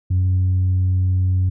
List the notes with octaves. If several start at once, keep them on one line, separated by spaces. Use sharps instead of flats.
F#2